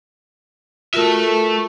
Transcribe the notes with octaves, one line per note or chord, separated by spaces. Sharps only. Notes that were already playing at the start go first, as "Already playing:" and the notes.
A3 F4 F#4 A#4 E5